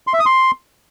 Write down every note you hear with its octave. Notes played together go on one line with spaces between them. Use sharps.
C6
E5
D#6
C6